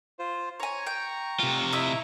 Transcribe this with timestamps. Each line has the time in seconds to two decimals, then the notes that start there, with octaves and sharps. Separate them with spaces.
0.19 F4 C5
0.60 C#5 G#5 A#5 C#6
0.87 G5
1.40 C3 F4
1.73 E4 D#5 E5